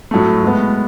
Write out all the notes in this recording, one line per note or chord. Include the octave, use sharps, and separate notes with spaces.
A2 F#3 A3
A2 G#3 B3